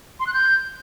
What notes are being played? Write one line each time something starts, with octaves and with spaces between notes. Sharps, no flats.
C6
F#6
G6